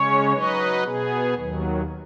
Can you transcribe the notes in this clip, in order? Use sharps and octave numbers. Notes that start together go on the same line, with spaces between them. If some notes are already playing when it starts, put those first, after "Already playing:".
Already playing: C#3 G#3 C#4 C#5
F#3 D#4 B4 D#5
B2 B3 G#4
D#2 D#3 F#3